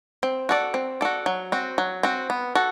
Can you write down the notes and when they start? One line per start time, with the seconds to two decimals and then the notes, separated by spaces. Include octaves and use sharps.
0.23 C4
0.49 F#4 A4 D5
0.74 C4
1.01 F#4 A4 D5
1.26 F#3
1.52 C4 F#4
1.78 F#3
2.03 C4 F#4
2.30 B3
2.55 F#4 A4